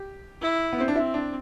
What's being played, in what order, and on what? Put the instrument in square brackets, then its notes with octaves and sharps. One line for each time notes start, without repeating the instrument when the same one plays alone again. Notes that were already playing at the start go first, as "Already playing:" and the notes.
Already playing: [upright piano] G4
[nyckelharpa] E4
[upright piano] B3
C4
D4
[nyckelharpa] C4 [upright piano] E4
[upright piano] D4